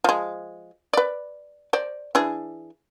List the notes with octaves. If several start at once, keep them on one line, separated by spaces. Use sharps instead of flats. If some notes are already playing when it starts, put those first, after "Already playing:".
F3 G#3
B4 D5
C5 D5
E3 D4 G#4